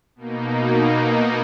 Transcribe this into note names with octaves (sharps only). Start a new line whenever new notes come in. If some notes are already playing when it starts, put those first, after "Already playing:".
B2 A#3 D#4